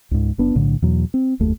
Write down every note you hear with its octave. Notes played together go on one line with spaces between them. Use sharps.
C#2 G#2
F#1 B3 D4
B1 A2 D3
E2 B2 F#3
C4
F#1 D#2 A3